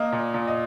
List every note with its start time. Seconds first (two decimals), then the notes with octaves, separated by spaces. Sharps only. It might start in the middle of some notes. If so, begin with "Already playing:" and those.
Already playing: A#3 D#5
0.12 A#2
0.34 A#2
0.47 D#5